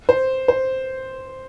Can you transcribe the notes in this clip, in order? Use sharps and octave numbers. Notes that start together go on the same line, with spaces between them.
C5
C5